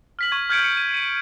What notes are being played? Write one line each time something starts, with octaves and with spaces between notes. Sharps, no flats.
F6 B6 F#7
C#6 G#6
F6 G6 G#6 C#7 D7
C#7 D7
D#7
D#7